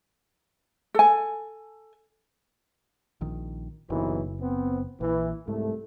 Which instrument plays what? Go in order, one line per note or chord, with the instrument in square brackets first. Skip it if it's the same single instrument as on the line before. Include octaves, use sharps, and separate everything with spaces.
[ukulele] A4 G#5
[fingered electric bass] A#1 D#3
[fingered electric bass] F#1 [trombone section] B1 C3 E3
[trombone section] B3 C4
[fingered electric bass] A#1 [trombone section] E3
[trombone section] C2 A3 [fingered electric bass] G#2